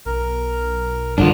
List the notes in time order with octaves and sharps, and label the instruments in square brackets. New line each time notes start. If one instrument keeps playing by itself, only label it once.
[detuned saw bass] B1 [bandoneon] A#4
[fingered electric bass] G2 D3 [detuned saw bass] D#3 [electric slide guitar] F3 D4